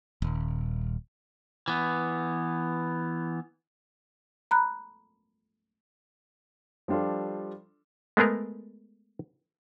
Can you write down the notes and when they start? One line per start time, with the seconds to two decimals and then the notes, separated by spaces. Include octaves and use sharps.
0.22 D#1
1.68 E3 B3
4.51 A#5 B5 F#6
6.88 F3 G3 D4 F4 A4
8.17 G#3 A3 B3 G#4 A#4